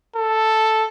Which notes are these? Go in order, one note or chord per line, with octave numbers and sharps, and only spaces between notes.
A4